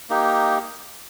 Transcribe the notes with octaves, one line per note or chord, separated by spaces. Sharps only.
A#3 D#4 G4